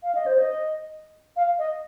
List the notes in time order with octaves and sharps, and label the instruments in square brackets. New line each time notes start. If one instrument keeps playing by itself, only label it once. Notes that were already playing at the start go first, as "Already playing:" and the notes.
[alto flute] F5
D#5
C5
D#5
F5
D#5